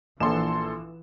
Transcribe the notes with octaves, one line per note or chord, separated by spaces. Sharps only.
A#1 E3 A4 C6 E7